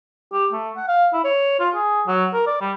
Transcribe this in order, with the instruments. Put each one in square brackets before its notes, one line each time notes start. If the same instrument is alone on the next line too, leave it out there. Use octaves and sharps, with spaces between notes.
[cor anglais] G4
A3
F#5
F5
E4
C#5
F4
G#4
F#3
A#4
D5
G3